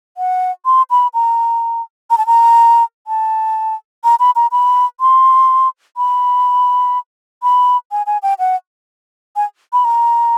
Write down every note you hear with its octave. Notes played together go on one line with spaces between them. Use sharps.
F#5
C6
B5
A#5
A#5
A5
A#5
A5
A#5
B5
A#5
B5
C6
B5
B5
G#5
G#5
G5
F#5
G#5
B5
A#5